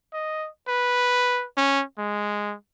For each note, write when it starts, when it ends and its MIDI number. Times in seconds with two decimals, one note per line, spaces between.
0.13 0.48 75
0.68 1.45 71
1.57 1.83 61
1.98 2.55 56